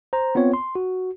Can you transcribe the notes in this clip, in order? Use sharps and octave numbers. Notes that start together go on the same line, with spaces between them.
C5 A#5
B3 C4 F4 C#5
C6
F#4